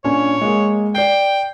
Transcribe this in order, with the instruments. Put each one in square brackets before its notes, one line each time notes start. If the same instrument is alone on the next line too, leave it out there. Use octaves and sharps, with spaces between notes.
[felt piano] A#2 C#4 D4 [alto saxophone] C#5
[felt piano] G#3 A#3
[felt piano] D5 C7 [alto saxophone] G5